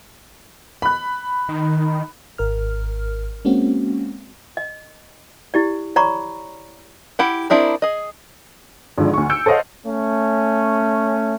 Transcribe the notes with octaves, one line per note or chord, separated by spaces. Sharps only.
B5 F#6
D#3
G#1 A#4 F6
G#3 A#3 C4 C#4 F#4
D#5
E4 G4 D5
C#5 D5 A#5 B5 C#6 D6
E4 G4 F#5
C4 D4 E4 G#4 A#4
G#4 D#5
G#1 G#2 D3 F3
D2 C#6
E6 G6 C#7 D7
A4 C5 C#5 D#5 F5 F#5
A3 C#4